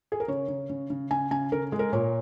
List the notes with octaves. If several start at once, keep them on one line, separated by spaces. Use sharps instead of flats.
G#4
A#4
C#3 C#5
C#3
C#3
C#3
C#3 G#5
C#3 G#5
C#3 A#4
G#3
A#4
A#2 C#5